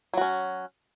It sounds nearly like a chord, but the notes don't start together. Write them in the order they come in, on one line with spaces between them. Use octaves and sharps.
F#3 F#4 C#4